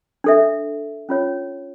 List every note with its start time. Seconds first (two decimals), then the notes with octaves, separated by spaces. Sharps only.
0.24 D4 A4 E5
1.09 C#4 F4 C#5